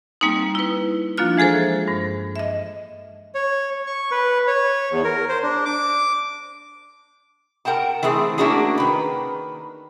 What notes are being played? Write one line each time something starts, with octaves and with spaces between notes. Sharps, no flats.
G3 A#3 C4 D#4
E4 B4
F3 A#3 D4 F4 F#6
E3 G#3 G#4 A4 C5
G2
D#5 E5
C#5
C#6
B4
C#5
E2
A#4
C5
D4
D6
A#4 F#5 G5 A5
E3 A3 C4 G#4
A3 A#3 C#4 D4 F#4 G#4
D#3 B4